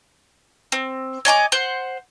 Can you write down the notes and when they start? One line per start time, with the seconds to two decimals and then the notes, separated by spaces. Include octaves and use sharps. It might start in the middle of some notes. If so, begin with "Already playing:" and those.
0.72 C4
1.25 C#5 D#5 G#5 D6
1.52 C5 F#5